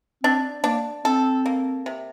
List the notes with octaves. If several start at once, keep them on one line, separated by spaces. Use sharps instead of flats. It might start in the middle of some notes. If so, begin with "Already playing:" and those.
C4 D4
A#3 D4
C4 A4
A#3
C3